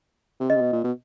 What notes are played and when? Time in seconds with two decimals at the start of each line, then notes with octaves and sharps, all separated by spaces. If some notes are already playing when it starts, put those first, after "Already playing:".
0.40 C3
0.50 C#3 D#5
0.56 C3
0.61 B2
0.72 A#2
0.84 B2